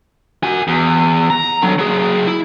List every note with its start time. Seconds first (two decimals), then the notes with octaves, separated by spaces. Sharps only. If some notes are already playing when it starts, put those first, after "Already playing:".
0.43 F#4 G#5
0.68 E2
1.30 A#5
1.62 D3 F#3
1.79 F#3 G#4
2.27 E4